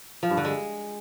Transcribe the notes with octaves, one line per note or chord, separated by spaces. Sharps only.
F3
G2
D3
G#3